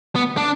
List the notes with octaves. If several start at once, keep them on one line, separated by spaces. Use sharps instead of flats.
B3
D4